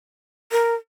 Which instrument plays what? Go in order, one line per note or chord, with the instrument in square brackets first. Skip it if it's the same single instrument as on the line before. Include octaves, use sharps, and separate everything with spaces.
[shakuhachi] A#4